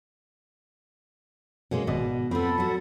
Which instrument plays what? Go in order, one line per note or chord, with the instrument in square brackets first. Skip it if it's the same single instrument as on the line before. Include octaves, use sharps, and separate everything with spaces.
[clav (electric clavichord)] B2 [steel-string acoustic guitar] G#3 A#3 C#4
[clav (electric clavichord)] G#1 D5 D#5 [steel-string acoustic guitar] B2
[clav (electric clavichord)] F2 [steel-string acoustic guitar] B3 C4 [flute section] A4 B5
[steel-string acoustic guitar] F#3 F#4